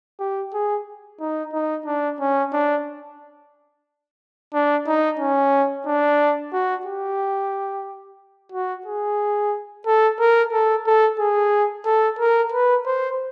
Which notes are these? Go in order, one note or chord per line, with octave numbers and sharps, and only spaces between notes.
G4
G#4
D#4
D#4
D4
C#4
D4
D4
D#4
C#4
D4
F#4
G4
F#4
G#4
A4
A#4
A4
A4
G#4
A4
A#4
B4
C5